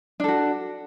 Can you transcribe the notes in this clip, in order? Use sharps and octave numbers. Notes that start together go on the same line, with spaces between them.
D4 F#4 A4